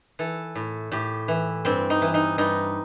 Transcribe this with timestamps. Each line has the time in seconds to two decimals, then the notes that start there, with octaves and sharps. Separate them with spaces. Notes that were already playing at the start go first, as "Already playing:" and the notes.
0.19 E3 A4
0.55 A2
0.92 A2 G4
1.28 E3
1.65 G2 C4
1.90 D#4
2.02 E3
2.14 D#4
2.38 G2 D#4